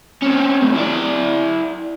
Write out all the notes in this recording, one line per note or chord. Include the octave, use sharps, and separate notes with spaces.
C4 C#4
E2 A2
E4 D5